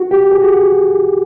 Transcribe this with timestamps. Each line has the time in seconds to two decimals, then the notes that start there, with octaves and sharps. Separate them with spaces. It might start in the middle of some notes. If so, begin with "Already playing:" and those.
Already playing: F#4
0.11 G4
0.31 G#4
0.42 F#4